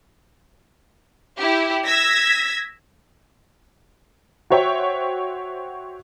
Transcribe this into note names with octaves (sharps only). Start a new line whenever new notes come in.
E4 G4
E6 G#6 A#6 B6
F#4 C5 C#5 E5 G5